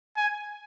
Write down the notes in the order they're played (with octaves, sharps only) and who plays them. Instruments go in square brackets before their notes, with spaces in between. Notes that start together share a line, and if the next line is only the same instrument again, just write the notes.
[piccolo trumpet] G#5